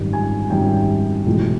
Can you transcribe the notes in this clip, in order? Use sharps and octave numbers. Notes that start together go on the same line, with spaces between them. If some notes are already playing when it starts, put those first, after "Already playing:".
Already playing: G#1 F#2 D#3 G3
G#5
G#1 F#2 D#3 G3 G5
B1 A2 E3 G#3